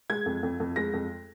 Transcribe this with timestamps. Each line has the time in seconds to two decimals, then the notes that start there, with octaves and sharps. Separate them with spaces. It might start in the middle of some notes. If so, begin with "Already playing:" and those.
0.10 G#3 G#6
0.26 F2
0.43 F2
0.60 F2
0.76 G#3 A#6
0.93 F2